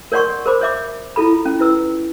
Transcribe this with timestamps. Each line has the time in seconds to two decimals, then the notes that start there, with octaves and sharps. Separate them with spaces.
0.12 A#4 C#5 D5 F#5 C6 C#6
0.46 A#4 C5 B5 D6
0.61 C#5 E5 D6
1.16 E4 F4 A4 B5
1.45 C#4
1.59 E4 B4 E6